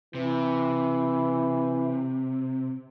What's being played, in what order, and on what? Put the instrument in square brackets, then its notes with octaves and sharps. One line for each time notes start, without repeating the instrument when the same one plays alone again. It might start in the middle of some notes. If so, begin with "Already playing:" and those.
[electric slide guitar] C3 [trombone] E3